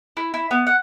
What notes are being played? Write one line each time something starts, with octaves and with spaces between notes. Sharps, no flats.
E4
E4
B3
F#5